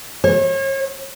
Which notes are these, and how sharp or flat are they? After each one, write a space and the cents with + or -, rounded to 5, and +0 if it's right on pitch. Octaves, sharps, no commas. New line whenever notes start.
C#5 -40